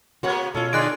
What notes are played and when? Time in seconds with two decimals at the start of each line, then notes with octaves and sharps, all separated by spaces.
0.23 C3 A#3 B3 F#4 C#5 F#5
0.55 B2 C#4 F4 A4
0.73 D3 G#4 D5 D#5 C6 F#6 D7